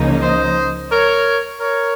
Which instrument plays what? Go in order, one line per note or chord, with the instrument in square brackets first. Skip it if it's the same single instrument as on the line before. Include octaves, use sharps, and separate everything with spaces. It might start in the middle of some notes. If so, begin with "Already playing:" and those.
Already playing: [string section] C#2 C#3 F3 A#3 D#4
[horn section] C5 D#5
A#4 C#5
A#4 C#5